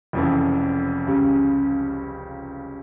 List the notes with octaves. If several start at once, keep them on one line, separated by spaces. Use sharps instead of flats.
F1 F2 C#3 E3
C#2 C#3 G3